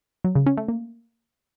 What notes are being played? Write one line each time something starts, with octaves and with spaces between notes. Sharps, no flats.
F#3
C#3
C#4
A3
A#3